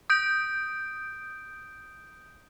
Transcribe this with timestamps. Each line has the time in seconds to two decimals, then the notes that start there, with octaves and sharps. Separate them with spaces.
0.10 D#6 G6 D7